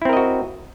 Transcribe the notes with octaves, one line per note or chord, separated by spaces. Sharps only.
C4 E4 F#4 A#4 D#5